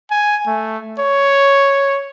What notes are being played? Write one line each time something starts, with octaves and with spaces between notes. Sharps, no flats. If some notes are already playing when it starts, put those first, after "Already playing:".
G#5
A3
C#5